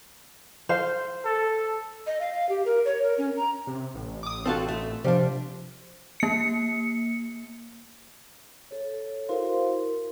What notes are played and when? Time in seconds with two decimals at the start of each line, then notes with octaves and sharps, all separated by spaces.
0.69 C5 F5
1.25 A4
2.07 D#5
2.20 F5
2.33 F5
2.49 G4
2.65 A#4
2.85 C#5
3.02 A#4
3.18 C#4
3.37 A#5
3.67 C3
3.94 A1
4.23 D6 D#6
4.45 C4 F4 F#4 A4 A5
4.68 A3
5.04 C3 F3 G3 D4
6.20 A#3 C#7
8.71 A4 C#5
9.29 E4 F#4 A#4 C5 F5 C6